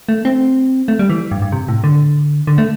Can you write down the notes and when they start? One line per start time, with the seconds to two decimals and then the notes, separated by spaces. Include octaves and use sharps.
0.09 A3
0.25 C4
0.88 A3
0.99 G3
1.10 E3
1.31 G2
1.42 G2
1.52 C3
1.68 A2
1.84 D3
2.47 D3
2.58 A3